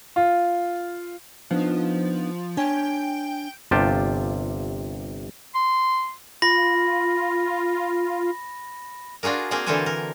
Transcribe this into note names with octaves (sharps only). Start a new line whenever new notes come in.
F4
F3 B3 D4 D#4
D4 C#5 G5 G#5
G1 C3 F4 G4 G5 A5
C6
F4 B5 A#6
D4 F4 F#4 G#4 A#4
A#3 C4 G#4 A#4
D3 E3 A4 A#4 C5 G#5
A#4